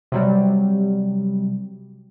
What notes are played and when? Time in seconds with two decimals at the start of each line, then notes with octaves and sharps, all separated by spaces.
0.12 C3 F#3 G3